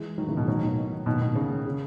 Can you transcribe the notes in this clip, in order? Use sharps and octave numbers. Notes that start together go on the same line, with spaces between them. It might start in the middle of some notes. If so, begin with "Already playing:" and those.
Already playing: E3 G#3
D#3 F#3
C#3 E3
B2 D#3
D#3 F#3
B2 D#3
B2 D#3
B2 D#3
C#3
C#3